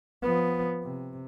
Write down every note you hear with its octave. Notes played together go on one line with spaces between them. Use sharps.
F3 B3
C3